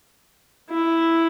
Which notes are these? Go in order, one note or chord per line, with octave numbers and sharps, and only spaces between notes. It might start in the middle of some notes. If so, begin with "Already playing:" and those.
E4